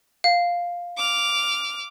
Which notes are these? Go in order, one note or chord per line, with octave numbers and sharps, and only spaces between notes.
F5
D6 F6